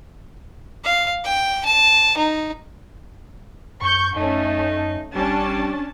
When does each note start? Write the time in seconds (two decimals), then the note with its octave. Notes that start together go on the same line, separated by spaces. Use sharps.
0.84 F5
1.24 G5
1.65 A5
2.17 D#4
3.82 F#2 C#6 G6
4.16 F#2 A3 C#4 D#4
5.15 G#1 G3 C#4 D4 A5